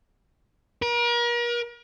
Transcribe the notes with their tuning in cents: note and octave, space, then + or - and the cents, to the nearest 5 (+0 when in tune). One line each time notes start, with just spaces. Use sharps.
A#4 +40